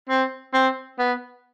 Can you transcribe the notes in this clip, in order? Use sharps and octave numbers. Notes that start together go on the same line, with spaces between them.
C4
C4
B3